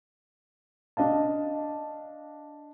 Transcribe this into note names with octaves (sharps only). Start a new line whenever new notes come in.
D4 D#5 F5 A5